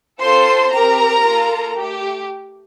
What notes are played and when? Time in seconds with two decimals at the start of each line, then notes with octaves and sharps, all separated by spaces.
0.21 C4 F4 A4 C5 C6
0.72 C4 G4 A#4 A#5
1.25 A#3 F4 A4
1.77 A3 G4